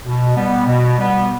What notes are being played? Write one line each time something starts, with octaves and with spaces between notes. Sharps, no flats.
B2
G3 B3
B2
G3 B3